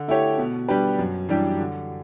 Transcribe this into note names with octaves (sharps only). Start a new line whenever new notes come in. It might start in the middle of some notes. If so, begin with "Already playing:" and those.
Already playing: D3
A3 E4 G4 C#5
B2
G3 D4 G4 B4
F#2
E3 G3 D4 G4
D3